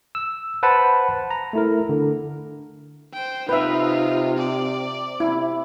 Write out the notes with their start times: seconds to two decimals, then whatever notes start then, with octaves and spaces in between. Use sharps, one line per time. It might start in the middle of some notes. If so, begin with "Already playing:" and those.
0.15 E6
0.63 B4 C5 F#5 A5 B5
1.31 A#5
1.53 A3 E4 A#4
1.89 D3
3.13 C5 G5
3.49 C3 D#4 F4 B4 E5
4.37 D5
5.20 C3 E4